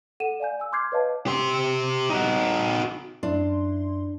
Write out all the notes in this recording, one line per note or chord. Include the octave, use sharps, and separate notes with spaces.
A4 F#5 D#7 E7
D5 F5 G#5 G6
G#5 E6
C6 D6 F6 G6 G#6 C7
B4 C#5 D#5 F5 A5
G4 C6
D#4 F#4
F#2 D4 E4 C6